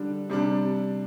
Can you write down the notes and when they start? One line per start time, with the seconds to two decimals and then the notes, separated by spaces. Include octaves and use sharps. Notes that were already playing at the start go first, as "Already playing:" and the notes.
Already playing: D3 G3 D4
0.30 C3 G3 D4